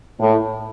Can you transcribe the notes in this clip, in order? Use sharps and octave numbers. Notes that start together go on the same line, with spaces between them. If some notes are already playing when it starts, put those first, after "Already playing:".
A2